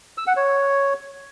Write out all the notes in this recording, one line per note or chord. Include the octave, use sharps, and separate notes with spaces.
E6
F#5
C#5